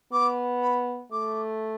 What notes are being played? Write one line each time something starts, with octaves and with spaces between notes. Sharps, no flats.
B3 D6
B5
A3 D6